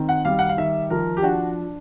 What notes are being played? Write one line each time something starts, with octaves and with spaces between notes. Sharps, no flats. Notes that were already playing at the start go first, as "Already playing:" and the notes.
Already playing: D#3 C4
F#5
G3 F5
F#5
F5
D#3 E5
F3 A#4
G4
D4 F#4